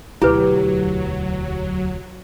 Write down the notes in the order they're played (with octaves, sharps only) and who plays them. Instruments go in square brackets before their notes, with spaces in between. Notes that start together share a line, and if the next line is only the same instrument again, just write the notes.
[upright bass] E1 D2 [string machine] F#3 [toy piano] E4 B4 [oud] G4